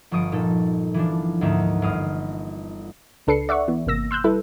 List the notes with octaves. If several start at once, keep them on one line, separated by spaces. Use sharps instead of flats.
G1 F3 C#6 D#6 D7
A#2 D#4 A4
E3 F3 D4
D2 G#2 A#3 D#4 E5
G1 F5 D#6
C#2 D4 A4 B4 C7 C#7
D5 E5 F#5 C#6
E3 B3
G#1 C3 A#3 E6 A#6
C6 E6 F#6 G6
G3 E4 A4 B4